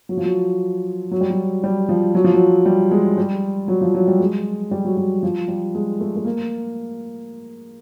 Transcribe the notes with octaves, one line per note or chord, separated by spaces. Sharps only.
F#3
F3
F#3
F#3
G3
F#3
G3
F3
F#3
F3
F#3
G3
G#3
G3
F#3
F3
F#3
G3
G#3
G3
F#3
G3
F3
G3
G#3
A3
A3
A#3